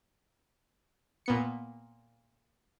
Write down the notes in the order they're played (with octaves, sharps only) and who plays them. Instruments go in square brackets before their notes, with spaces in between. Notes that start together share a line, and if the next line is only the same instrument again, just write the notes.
[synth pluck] A#2 B3 C#7